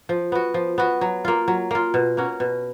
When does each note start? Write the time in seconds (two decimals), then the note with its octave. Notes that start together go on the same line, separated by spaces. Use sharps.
0.09 F3
0.32 B3 F#4
0.54 F3
0.78 B3 F#4
1.01 F#3
1.25 A#3 F4
1.48 F#3
1.71 A#3 F4
1.94 B2
2.17 A#3 C#4 F#4
2.40 B2